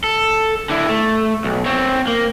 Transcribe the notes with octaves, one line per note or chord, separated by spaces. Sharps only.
A4
D3 E4
A3
B1
C4 C#5
A#3